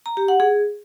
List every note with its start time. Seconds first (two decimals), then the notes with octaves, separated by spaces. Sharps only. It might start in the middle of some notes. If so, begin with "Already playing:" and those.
0.06 A#5
0.17 G4
0.28 F#5
0.40 G#4